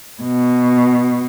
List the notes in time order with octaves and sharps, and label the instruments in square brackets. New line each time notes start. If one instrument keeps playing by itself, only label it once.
[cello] B2